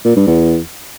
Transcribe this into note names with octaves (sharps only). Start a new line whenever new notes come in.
A#2
G2
E2